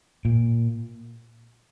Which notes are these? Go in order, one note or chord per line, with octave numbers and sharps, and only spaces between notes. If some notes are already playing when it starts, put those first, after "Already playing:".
A#2